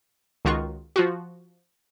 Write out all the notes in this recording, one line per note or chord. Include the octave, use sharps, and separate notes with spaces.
C#2 D#3 F4 F#4 C#6
F3 F4 F#4